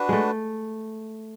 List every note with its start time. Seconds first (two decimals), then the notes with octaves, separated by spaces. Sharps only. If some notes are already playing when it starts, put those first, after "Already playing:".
Already playing: D4 F#4 B4
0.09 G#3 A3